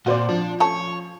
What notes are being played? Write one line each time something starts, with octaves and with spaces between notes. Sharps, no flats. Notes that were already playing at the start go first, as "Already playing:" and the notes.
A#2 F4 F#4 C5 D5
F3 D4
A3 C#4 C#5 A5